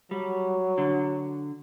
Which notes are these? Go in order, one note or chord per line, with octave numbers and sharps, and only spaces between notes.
F#3 G3
D3